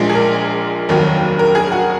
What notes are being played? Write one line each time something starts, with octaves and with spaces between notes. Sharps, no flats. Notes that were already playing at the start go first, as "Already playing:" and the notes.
Already playing: A#1 A#2 G#3
G#4
A#4
F1 D#2 D#3 F#3 A#4
A#4
G#4
F#4